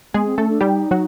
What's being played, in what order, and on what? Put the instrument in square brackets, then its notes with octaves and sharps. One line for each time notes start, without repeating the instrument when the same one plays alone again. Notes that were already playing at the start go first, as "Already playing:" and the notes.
[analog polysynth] G#3 G#4 [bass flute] B3
[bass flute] C4
[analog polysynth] A3 A4 [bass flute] C#4
[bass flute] D4
[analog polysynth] G3 G4 [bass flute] D#4
[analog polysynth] F#3 F#4